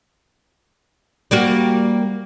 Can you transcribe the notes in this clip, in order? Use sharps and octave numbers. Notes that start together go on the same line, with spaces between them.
G3 A#3 F#4